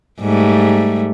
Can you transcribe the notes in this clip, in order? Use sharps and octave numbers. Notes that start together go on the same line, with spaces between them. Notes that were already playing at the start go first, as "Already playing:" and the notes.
G#2 G3 A3